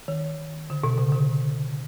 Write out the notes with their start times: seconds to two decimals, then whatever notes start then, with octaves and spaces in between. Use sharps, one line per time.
0.08 D#3
0.70 D3
0.84 B2
0.98 C#3
1.12 D3